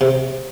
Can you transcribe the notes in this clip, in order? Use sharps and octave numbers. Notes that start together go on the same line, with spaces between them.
C3